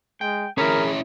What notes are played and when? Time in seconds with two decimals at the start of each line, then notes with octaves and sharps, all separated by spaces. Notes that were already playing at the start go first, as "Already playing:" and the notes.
0.21 G#3 G5
0.58 C#4 E4 G#4 A#4 C#5 B5